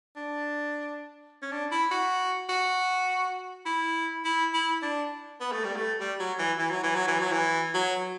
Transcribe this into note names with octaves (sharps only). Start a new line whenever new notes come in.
D4
C#4
D4
E4
F#4
F#4
E4
E4
E4
D4
B3
A3
G3
A3
G3
F#3
E3
E3
F#3
E3
F#3
E3
F#3
E3
F#3